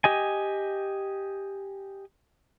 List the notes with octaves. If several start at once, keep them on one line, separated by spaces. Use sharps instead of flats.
G4 D#5 G#5